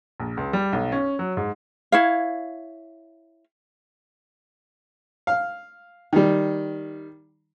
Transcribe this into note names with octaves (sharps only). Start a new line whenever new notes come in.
A#1
C#2
G3
B1
C#4
F#3
G#2
E4 C#5 F5
F5
D#3 G3